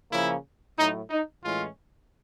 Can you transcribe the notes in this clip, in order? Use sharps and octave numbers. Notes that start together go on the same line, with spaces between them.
C#3 F3 A#3 C#4 E4
A2 F#3 A3 D#4
D#4
A2 E3 G#3 C#4 F4